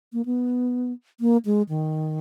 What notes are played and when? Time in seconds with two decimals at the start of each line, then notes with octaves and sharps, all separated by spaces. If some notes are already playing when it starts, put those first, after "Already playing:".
0.13 A#3
0.25 B3
1.20 A#3
1.45 G#3
1.69 D#3